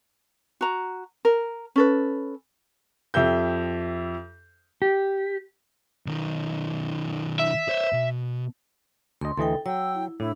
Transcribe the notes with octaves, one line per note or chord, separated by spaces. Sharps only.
F#4 A#5
A#4
C#4 A4 B4
F2 G4 E5 G6
G4
B1 D#3
E5
C5 C#5
B2
D2 D#5 C6
D2 E3 A4 D#5 G5
F#3 G5 E6
E4
A2 D4 E4